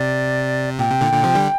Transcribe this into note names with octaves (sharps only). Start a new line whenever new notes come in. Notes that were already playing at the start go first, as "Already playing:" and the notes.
Already playing: C3 D5
A#2 G5
C3
A#2 D3
A#2 D3
C3 F3
D3 G3